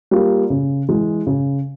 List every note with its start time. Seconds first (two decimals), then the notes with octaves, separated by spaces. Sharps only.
0.11 G3 A#3 F4
0.50 C#3
0.89 E3 G#3
1.27 C#3